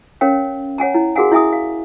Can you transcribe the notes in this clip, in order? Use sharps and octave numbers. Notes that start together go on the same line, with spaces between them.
C#4 A#4 C#5 F5 G5
C#5 F#5 G#5 A#5
E4
F#4 G#4 A#4 F5 F#5 G#5
E4 E5 G#5 D#6
F5